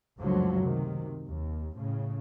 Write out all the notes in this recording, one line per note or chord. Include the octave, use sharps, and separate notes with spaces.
C#2 F#2 D3 F3 F#3 A3
C3 D#3
D#2
A2 C#3